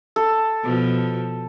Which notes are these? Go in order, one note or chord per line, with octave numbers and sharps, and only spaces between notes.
A4
B2 F3